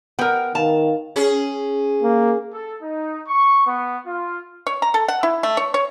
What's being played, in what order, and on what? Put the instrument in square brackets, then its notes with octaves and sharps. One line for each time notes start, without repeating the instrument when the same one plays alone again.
[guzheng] B3 [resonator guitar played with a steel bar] A#4 G5
[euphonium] D#3 [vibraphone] F5 [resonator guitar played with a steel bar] A5
[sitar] C#4 G#4
[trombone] A#3
[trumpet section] A4
D#4
C#6
B3
F4
[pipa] C#5
A#5
A4
F#5
E4
A3
C#5
C#5